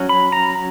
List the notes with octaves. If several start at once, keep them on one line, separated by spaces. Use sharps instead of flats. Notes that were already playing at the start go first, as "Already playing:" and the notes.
Already playing: F#3 C#4
B5
A#5